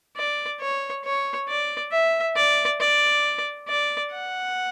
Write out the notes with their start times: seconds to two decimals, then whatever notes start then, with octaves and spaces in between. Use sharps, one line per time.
0.17 D5
0.60 C#5
1.05 C#5
1.48 D5
1.92 E5
2.36 D5
2.80 D5
3.68 D5
4.12 F#5